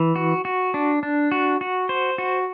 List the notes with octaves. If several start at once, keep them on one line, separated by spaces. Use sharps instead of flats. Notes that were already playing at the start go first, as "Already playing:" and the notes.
Already playing: E3
F#4
F#4
D4
D4
F#4
F#4
C5
F#4